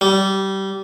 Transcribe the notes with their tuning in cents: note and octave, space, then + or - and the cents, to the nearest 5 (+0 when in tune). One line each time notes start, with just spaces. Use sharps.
G3 -20